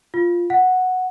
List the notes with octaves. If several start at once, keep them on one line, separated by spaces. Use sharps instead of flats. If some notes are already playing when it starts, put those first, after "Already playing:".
F4
F#5